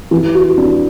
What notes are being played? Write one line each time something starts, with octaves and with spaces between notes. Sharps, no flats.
E3
F#4
D4